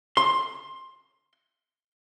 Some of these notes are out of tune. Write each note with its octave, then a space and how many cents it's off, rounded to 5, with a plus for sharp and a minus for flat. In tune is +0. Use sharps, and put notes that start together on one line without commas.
C6 +15